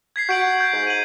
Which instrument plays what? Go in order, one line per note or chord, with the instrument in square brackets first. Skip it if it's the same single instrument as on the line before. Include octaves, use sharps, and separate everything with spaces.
[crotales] G#6 B6 C7
[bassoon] F#4 [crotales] G6 D7 F#7
[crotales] G6
[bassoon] G#2
[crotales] D#7 F#7